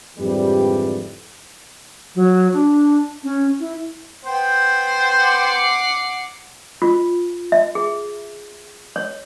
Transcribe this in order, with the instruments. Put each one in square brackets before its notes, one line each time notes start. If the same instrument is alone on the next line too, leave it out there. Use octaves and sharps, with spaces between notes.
[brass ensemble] F2 G#2 D3 E3 G3
[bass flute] F#3
D4
C#4
E4
[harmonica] B3 C5 G5
[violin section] F#5 D6 C7
[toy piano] F4
E5
G#4
C#5